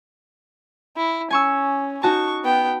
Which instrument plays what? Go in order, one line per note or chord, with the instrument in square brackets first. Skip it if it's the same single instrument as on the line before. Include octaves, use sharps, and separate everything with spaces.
[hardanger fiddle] E4
[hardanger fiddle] C#4 [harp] G#5 C#6 E6
[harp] D#4 F#4 A5 [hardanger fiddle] C#6
[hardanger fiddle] B3 G5